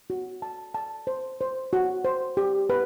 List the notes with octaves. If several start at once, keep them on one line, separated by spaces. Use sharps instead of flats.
F#4
A5
A5
C5
C5
F#4
C5
G4
B4